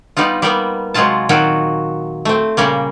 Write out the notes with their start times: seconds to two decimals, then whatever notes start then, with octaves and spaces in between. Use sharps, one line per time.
0.17 G3 B3 D#4 F4
0.42 G3 A#3 B3
0.94 C3 F#3 G#3 C4 F4 A5
1.29 A#2 D#3 F#3 C4 F4 F#4
2.25 A3 C4
2.57 A#2 C#3 G3 A#3